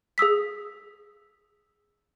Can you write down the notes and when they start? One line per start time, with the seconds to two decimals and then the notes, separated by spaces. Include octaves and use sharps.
0.18 G#4 D#6 E6 B6